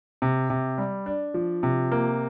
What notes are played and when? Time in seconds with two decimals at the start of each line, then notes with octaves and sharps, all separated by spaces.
0.22 C3
0.50 C3
0.78 G3
1.06 D4
1.34 F3
1.63 C3
1.92 A#3